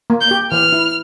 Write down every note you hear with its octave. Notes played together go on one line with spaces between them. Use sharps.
A#3
G6
G4
E3 F6
E4